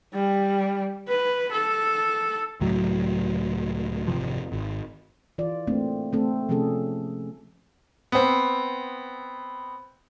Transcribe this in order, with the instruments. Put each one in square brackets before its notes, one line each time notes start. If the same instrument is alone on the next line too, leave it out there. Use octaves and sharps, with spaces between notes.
[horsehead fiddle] G3
B4
A4
[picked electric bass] C#2 A2 F#3
G#1 F2 C3 F3
G#1
[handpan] E3 F4 D5
A3 A#3 C4 D4
A3 A#3 C4 A4
C3 F3 A3 C#4 G#4 A4
[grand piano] B3 C4